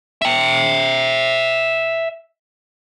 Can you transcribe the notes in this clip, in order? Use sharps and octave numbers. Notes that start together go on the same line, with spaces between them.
E5 G5